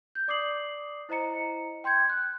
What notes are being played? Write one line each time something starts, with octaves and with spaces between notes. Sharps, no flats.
G6
D5 D6 D#6 C7 F#7
E4 C5 D#5 A#5 C#7
G5 C6 G6 G#6
F#6